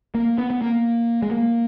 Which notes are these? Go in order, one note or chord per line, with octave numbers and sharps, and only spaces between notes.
A#3
B3
B3
A#3
G#3
A#3